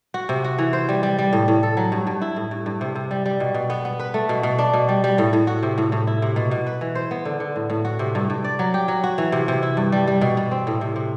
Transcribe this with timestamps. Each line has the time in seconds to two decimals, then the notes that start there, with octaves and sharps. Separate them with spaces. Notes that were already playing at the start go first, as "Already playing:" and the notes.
0.14 F#4
0.29 C3
0.44 F#4
0.58 E3
0.73 C5
0.89 G3
1.03 G3
1.19 G3
1.33 A2
1.48 A2
1.63 A4
1.77 F#3
1.92 G2
2.07 G2
2.21 E4
2.36 A2
2.51 G2
2.66 G2
2.81 C3
2.95 C3
3.11 G3
3.26 G3
3.40 B2
3.54 B2
3.70 B3
3.85 B3
3.99 B4
4.14 A3
4.29 B2
4.43 B2
4.59 D4
4.74 B2
4.89 G3
5.04 G3
5.18 A2
5.33 A2
5.47 F#4
5.63 C3
5.78 A2
5.92 A2
6.07 E4
6.22 C3
6.36 B2
6.51 B2
6.67 B4
6.81 E3
6.95 C5
7.11 B3
7.25 D3
7.40 D3
7.56 A2
7.70 A2
7.85 F#4
7.99 C3
8.15 G2
8.30 G2
8.44 D5
8.59 F#3
8.74 G4
8.88 F#3
9.04 F#4
9.18 E3
9.32 C3
9.48 C3
9.63 E4
9.77 G2
9.92 G3
10.08 G3
10.21 B2
10.37 B2
10.51 C4
10.67 A2
10.81 C3
10.96 C3